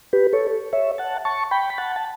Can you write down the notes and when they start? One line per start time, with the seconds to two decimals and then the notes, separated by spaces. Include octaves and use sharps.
0.13 G4 B4
0.33 A4 C#5
0.73 C#5 E5
0.98 F#5 A5
1.25 A5 C#6
1.51 G5 B5
1.70 B5
1.78 F#5 A5
1.96 A5